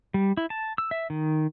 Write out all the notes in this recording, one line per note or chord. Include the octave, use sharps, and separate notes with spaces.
G3
E4
A5
E6
E5
D#3